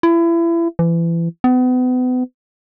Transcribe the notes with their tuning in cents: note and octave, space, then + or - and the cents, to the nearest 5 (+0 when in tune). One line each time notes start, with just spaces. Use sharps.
E4 +30
E3 +30
B3 +35